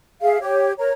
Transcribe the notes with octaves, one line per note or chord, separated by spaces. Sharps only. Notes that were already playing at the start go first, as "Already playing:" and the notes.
G#4 E5 F5
G4 C#5
A#4 C#5 A#5